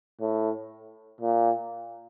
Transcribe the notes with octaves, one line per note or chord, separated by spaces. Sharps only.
A2
A#2